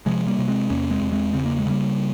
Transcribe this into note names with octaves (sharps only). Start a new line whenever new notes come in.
C3 F3 G#3
G3 A#3
C3
G#3 C4
E2 A#3 C#4
G#3 C4
E2
G#3 C4
C#3 C4
A#3
G#3
C#3 G3 A#3